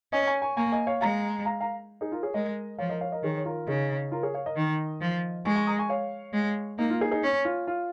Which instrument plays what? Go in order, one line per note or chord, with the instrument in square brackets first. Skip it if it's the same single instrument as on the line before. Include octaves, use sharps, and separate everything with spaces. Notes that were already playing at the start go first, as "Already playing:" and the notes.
[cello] C#4 [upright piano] D#5 G#5
[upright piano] G#5 C#6
G#5 C#6
[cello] A#3 [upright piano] G#5 C#6
[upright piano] D#5 G#5
C#5 F5
[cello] G#3 [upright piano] F5 A#5
[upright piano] F5 A#5
F5 A#5
D#4 G#4
F4 A#4
G#4 C#5
[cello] G#3 [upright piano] A#4 D#5
[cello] F3 [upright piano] C#5 F5
[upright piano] A#4 D#5
C#5 F5
A#4 D#5
[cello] D#3 [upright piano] G#4 C#5
[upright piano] C#5
F4 A#4
[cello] C#3 [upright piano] D#4 G#4
[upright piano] F4 A#4
G#4 C#5
C#5 F5
A#4 D#5
[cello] D#3
F3
[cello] G#3 [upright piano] G#5 C#6
[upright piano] G#5 C#6
A#5 D#6
G#5 C#6
C#5 F5
[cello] G#3
[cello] A#3 [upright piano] D#4
[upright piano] F4
D#4 G#4
D#4 G#4
[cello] C#4
[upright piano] F4
F4